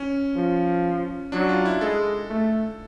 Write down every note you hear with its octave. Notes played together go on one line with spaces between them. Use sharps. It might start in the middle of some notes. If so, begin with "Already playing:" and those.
Already playing: C#4
F3
F#3 D4
F4
E4
G#3 A4
A3